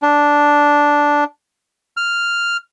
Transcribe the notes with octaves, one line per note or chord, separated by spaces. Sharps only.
D4
F6